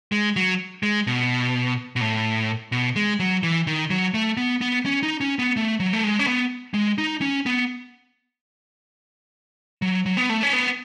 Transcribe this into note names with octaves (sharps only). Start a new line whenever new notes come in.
G#3
F#3
G#3
B2
B2
A2
B2
G#3
F#3
E3
D#3
F#3
A3
B3
B3
C#4
D#4
C#4
B3
A3
F#3
A3
G#3
C#4
B3
G#3
D#4
C#4
B3
F#3
F#3
B3
A3
C#4
B3